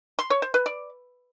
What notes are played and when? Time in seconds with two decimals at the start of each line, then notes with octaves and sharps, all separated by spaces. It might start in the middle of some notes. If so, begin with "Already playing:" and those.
0.19 C6
0.30 C#5
0.42 C5
0.54 B4
0.66 D5